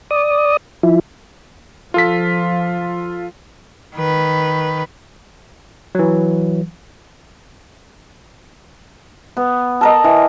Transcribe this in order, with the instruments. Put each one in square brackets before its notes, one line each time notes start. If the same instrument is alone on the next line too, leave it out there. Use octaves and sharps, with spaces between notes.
[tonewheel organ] D5 D#6
F3 E4
[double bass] F3 [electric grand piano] F4 A4 B6
[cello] D#3 B4
[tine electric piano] E3 F#3
[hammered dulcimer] B3
A4 A#4 D#5
E3